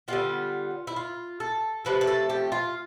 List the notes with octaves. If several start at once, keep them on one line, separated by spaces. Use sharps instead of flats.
D3 G3 B3 F4
E4
F4
A4
C3 F3 A3 B4
B4
A4
G4
F4